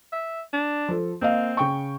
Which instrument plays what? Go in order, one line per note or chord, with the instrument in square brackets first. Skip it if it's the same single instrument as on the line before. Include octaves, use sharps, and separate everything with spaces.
[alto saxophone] E5
D4
[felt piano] F3 A4
[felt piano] A#3 D#5 F5 [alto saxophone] C4
[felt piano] C#3 G5 C#6